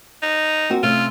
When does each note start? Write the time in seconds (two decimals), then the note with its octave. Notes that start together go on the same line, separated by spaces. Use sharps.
0.23 D#4
0.70 A#3 C4 F#4
0.83 C3 A3 C#4 F4